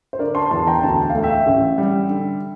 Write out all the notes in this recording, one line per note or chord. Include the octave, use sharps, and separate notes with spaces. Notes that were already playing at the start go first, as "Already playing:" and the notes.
C5
D3 A#4 D5
A5 C6
E2 A5 C6
G5 A#5
D2 A5
G5
F5
A3
E5 G5
A1
G3
D3